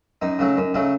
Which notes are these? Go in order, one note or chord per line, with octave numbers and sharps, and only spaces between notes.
F#2 D#4
C#3 F#3 A3
F#2
C#3 F#3 A3